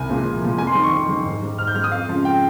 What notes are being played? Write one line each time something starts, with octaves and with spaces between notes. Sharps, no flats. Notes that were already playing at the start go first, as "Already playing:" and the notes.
Already playing: C2 G#5
A#2 F3 G#3
C2
A#2 F3 G#3
F2 G#5
C6
D#3 G3
C#6
F2
D#3 G3
G#2
G3
G#2 F6
G6
G3 F6
D#6
F2 F5
C#3 F3 G#3
G5